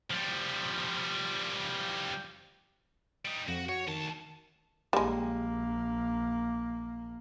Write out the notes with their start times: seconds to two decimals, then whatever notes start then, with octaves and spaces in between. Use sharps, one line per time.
0.11 F3 G3
3.25 G3 D#4
3.48 F2 F#4
3.69 F#4 C#5
3.87 D2 D#3 A5
4.93 A#1 G3 G#3 A#3